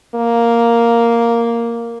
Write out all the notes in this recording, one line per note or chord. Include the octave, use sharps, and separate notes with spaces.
A#3